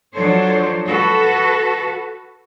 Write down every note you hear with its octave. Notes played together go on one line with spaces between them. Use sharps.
F3 F#3 D4 A4 C5 C#5
F#4 A4 B4